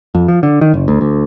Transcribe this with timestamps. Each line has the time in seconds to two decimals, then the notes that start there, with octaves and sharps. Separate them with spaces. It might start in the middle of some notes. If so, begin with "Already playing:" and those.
0.15 F2
0.28 F3
0.43 D3
0.61 D#3
0.74 F#1
0.88 D2
1.01 D2